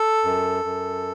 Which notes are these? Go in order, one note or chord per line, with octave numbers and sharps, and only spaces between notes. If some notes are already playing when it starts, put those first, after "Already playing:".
Already playing: A4
F#2
F#2